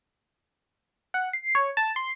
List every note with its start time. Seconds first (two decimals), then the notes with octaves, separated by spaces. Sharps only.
1.14 F#5
1.33 C7
1.55 C#5
1.77 A5
1.96 C6